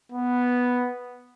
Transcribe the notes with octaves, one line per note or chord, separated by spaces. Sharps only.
B3